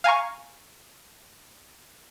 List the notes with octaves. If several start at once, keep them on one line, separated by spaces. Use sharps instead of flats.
F5 G#5 A#5 C#6